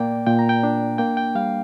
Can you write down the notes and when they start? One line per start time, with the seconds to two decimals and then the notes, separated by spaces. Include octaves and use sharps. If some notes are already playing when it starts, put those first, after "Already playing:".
Already playing: A#2 A#3 D5 G5
0.27 A#2 G5
0.39 A#5
0.49 G5
0.63 D4
0.98 A#3 G5
1.17 G5
1.35 G3 F5